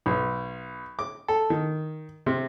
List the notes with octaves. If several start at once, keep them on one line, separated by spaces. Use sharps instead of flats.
B1
D6
A4
D#3
C3